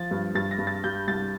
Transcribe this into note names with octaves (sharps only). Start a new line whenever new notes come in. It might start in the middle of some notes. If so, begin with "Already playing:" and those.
Already playing: F3 A6
G2
G2 A6
A#6
G2
A6
G3 G6
C2 A6